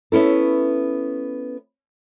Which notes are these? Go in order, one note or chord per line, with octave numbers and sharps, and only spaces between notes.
B3 C#4 E4 A4